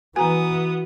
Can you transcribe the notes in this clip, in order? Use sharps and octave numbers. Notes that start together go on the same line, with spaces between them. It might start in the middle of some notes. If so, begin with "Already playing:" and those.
E3 B3 F#4 G#5 A#5 D#6